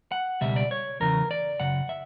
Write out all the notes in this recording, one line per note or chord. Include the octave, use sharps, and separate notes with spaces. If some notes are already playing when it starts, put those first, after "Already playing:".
F#5
C#2 B2 G3 E5
D5
C#5
E2 C#3 E3 A#4
D5
F#2 C#3 F#5
E5